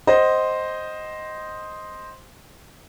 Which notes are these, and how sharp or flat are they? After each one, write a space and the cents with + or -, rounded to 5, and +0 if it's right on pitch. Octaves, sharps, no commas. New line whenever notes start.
C5 +0 D#5 +0 F#5 +30